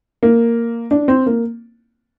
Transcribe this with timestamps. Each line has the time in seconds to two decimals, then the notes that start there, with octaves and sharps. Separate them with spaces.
0.23 A#3
0.91 D4
1.08 C4
1.26 A#3